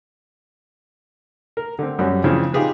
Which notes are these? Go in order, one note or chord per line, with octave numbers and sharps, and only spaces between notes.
A#4
D3 C4
F#2 G3 C#4 F#4
C#3 E3 F3 C4 D4
D#4 F4 G4 G#4 B4